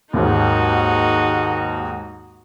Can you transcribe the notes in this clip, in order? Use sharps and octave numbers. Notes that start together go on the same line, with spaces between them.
D#2 G#2 D#4 F#4